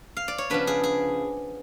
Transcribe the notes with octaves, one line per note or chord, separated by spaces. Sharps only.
F5
D5
C#5
C#3 F3 B3 D4 B4
G#4
G#4